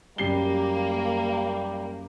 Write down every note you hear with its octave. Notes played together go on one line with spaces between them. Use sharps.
F#2 G3 A#3 G4 C7 G7